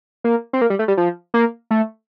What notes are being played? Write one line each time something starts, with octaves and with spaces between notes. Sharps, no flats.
A#3
C4
A#3
G3
A3
G3
F3
A#3
A3